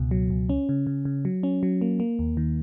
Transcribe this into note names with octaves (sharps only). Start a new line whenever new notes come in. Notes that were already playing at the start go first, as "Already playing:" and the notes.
Already playing: C#2 B2
F#3
C#2
C#4
C#3
C#3
C#3
F#3
C#4
F#3
A#3
A#3
D#2
D#3